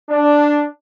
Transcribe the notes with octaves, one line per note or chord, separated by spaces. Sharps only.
D4